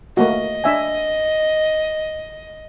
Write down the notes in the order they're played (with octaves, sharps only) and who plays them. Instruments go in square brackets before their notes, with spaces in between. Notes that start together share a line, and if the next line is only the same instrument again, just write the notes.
[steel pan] A3 A#3 F#4 [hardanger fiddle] D#5
[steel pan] D4 E5 G#5